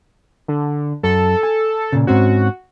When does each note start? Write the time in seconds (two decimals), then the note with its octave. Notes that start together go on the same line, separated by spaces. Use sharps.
0.48 D3
1.03 F#2 A4
1.43 G#5
1.93 A#2 C#3
2.07 G#2 C4 C#4 F#4